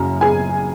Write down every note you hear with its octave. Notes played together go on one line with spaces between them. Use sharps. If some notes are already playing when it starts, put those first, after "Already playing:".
Already playing: F#1 F#2 C#3 F#3 A#5
G#4 G#5